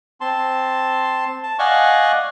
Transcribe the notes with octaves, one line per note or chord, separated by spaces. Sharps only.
C4 A5 C6
A5
D5 D#5 F5 F#5 G#5 C#6